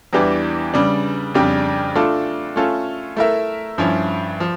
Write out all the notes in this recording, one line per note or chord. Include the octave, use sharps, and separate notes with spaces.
E2 E3 G3 D4 G4
C#3 G3 D4
F2 C#3 G3 D4 G4
A3 D4 F4 A4
A3 C#4 F4 A4
A3 E4 A#4 E5
G2 F3 C#4 E4
F3